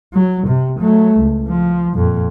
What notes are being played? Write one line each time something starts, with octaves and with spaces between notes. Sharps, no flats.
F#3
C3
F#3 A3
C#2
F3
F2 A#2